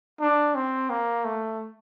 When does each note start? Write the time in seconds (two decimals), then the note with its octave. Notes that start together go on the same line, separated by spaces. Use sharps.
0.20 D4
0.56 C4
0.90 A#3
1.25 A3